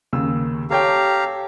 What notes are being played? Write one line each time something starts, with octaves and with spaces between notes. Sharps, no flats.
D#2 C#3 E6
G4 A4 C#5 F5 G5 A#5